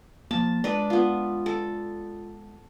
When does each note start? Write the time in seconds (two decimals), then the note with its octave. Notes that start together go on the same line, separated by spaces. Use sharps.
0.31 F3 A#3 A5
0.64 G#3 D4 B4
0.90 B3 F4
1.46 A4